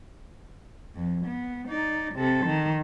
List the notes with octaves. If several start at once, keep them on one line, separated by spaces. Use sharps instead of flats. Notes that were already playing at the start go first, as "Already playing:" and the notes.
F2
B3
D#4 D5
C3 A4
D#3